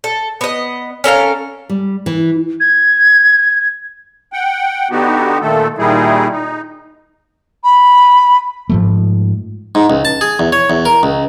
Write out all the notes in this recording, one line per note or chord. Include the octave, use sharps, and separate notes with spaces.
A4
B3 D#5
C#4 A4 A#4 F5
G3
E3
G#6
F#5 G5
D3 B3 D#4 F#4 G4
A#2 D#3 A3 A4
A#2 D#3 G3 D#4 E4 G#4
D#4
B5
G#2 F3 A3
G#2
C#2
A5
G#4
E2
C#5
E2
A#4
C#2